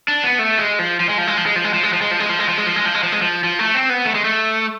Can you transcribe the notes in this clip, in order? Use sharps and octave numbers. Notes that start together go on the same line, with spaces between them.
D4
B3
A3
G#3
F3
F3
G#3
F3
G#3
F3
G#3
F3
G#3
F3
G#3
F3
G#3
F3
G#3
F3
G#3
F3
G#3
F3
G#3
F3
G#3
F3
G#3
F3
F3
A3
C4
B3
A3
G#3
A3